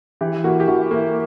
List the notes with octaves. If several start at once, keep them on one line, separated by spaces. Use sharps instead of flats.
E3 G4
A#3 E4 F#4
G4
E3 F#4
A#3 E4